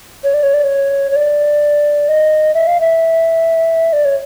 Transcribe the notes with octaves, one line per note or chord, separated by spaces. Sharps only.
C#5
D5
C#5
D5
C#5
C#5
D5
D#5
E5
F5
E5
D5
C#5